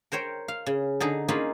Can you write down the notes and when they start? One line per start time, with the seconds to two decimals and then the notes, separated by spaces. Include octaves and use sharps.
0.12 A#4 C5 C#5 G5
0.48 F5
0.66 C#3
1.00 D3 D#4 G#4
1.28 A#3 C#4 D#4 F4 G#4 B5